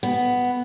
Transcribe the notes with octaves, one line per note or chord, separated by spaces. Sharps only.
B3